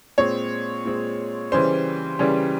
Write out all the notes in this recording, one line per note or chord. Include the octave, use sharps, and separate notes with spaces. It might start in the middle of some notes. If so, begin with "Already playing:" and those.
A#2 G#3 C4 C#5
A#2 G#3 C4
C#3 E3 G3 C#4 C5
C#3 E3 G3 C#4